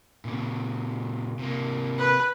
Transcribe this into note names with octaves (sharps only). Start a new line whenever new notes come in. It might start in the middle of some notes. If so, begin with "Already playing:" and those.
A#2 C#3
C3 A#3
B4